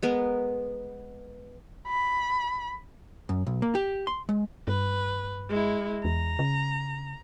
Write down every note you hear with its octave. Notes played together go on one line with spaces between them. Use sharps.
G#3 B3 A#4
B5
F#2
B1
A#3
G4
C6
G#3
G2 B4
G#3 E4
E2 A#5
C#3